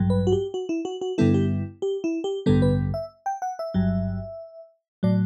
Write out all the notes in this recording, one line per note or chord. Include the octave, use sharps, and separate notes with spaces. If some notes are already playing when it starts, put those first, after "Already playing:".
Already playing: A1 G2 F#3
B4
F#4
G4
F#4
E4
F#4
F#4
G2 D3 G3 B3 E4 A4
G4
G4
E4
G4
A1 G2 D3 G3 B3 A4
B4
E5
G5
F#5
E5
G1 G2 F#3
A2 F#3 D5